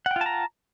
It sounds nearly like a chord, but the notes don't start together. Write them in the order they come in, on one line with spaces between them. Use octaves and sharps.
F#5 G5 F4 A5 A#5